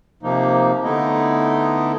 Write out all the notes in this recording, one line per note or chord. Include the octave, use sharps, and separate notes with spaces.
C3 F3 A#3 D#4
D3 A3 B3 D#4 E4 D#5